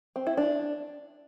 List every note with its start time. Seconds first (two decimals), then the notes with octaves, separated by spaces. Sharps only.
0.16 C4
0.27 E4
0.37 D4